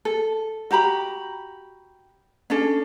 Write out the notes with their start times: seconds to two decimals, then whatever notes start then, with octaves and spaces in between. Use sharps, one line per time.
0.05 A4
0.71 F#4 G4 A#5 B5
2.50 C#4 D4 A4